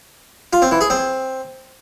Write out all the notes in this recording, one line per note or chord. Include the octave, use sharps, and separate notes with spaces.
F4
C4
E3
G#4
C4